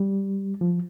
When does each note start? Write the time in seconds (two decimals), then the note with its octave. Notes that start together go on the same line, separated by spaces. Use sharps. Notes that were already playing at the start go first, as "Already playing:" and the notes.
Already playing: G3
0.61 F3